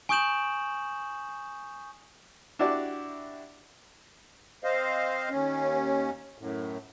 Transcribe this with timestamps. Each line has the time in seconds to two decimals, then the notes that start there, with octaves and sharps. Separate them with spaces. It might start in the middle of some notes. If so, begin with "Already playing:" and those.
0.09 G#5 C#6 D#6 G6 E7 F#7
2.59 D4 E4 F#4 G4 D5
4.64 C4 C5 D#5 F5
5.30 D#2 C#4
6.39 F#2 A2